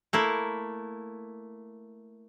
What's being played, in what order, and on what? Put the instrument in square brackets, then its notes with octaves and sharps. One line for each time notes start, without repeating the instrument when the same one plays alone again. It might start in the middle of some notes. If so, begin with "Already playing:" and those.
[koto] A3 A#3 E4